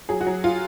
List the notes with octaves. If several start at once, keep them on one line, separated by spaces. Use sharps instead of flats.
F#3 G#4
F#4
F#3
F4